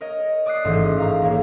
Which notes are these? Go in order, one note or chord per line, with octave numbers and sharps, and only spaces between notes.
A#4 C#5 D#5
D5 C#6 D#6 F#6 C7
A1 G#2 D#3
F5 A#5 C#6
D#1 A#3 C#5